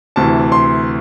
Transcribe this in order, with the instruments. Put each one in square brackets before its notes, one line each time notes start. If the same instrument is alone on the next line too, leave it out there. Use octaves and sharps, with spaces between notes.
[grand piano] D2 C3 E3 A5
C6